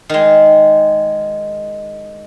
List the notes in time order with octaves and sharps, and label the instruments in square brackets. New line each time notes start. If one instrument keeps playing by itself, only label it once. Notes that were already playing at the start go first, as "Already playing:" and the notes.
[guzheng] D#3 G#3